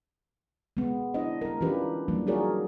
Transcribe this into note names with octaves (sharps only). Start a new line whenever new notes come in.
G#3 B3
D4 E4 C5 D#5
G#3 A#4
E3 C#4 D4 F4 G4 B4
E3 F#3 G3 A#3 D4
D#4 F#4 G#4 A#4 C#5 D5